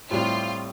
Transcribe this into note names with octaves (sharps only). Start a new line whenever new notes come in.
A2 G3 C4 F4 G4